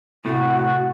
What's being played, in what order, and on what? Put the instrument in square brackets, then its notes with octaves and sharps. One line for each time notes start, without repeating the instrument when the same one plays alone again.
[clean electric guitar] A2 C3 A3 [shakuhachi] F#4